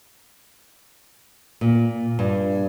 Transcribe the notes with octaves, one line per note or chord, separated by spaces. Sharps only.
A#2
G2 G3